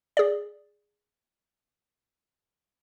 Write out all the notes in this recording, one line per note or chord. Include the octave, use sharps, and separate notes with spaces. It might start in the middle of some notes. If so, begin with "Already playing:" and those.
G#4 D5